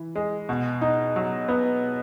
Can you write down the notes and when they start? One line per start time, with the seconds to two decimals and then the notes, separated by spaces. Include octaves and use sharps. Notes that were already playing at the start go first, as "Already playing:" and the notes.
Already playing: E3
0.16 G#3
0.49 B2
0.81 D#4
1.16 F#3
1.49 B3